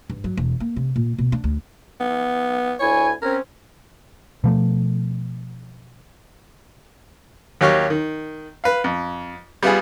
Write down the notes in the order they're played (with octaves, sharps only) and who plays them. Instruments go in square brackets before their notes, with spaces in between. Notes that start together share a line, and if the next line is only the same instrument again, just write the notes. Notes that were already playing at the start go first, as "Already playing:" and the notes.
[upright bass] G2
F#3
E1
A#3
C3
A#2
B2
D4
D2
[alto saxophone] B3
[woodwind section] D2 E4 G#5 [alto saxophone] C#5
[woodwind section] C4 C#4 [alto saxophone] A#4
[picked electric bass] B2 F3 A3
[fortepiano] D#2 F#3 A#3 G4 C#5 F6
D#3
B4 F5
F2
G3 B3 F4 G#4